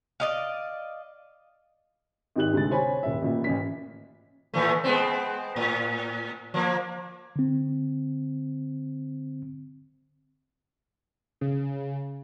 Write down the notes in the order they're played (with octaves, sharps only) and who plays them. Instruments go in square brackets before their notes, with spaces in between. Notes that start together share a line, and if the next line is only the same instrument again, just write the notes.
[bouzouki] D5 D#5 F5
[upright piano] G#1 D#4 G4 F#6 F#7
D2 C3 G#3 A6
C5 C#5 G#5 B5
D#1 E5
A1 A#2 E5
A1 C#4 B6
[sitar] A2 E3 A3
G#3 B3 C4
A2
F3 A#3
[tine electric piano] D3 C4
[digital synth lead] C#3